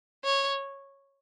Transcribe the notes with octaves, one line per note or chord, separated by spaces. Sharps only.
C#5